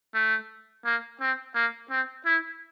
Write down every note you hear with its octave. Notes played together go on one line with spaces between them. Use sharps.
A3
A#3
C4
A#3
C4
E4